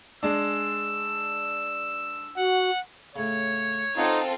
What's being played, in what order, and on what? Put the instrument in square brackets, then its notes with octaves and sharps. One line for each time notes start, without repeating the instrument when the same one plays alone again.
[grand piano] G#3 D4 [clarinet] E6
[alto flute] F#4 [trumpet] F#5
[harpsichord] A2 C#3 [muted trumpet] C#5
[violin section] C4 F4 A4 [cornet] D#4 [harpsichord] F5 F#5